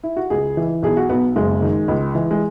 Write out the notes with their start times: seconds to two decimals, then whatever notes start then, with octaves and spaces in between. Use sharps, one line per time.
0.03 E4
0.17 F#4
0.30 C#2 G#4
0.57 E3
0.83 B1 G#4
0.97 F#4
1.09 B1 B3
1.36 F#1 G#3
1.62 D#3
1.88 C#2
2.15 E3
2.31 G#3